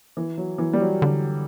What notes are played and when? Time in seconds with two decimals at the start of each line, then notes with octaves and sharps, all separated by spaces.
0.17 E3
0.37 F#3
0.58 E3
0.73 G3
0.81 F#3
1.02 D3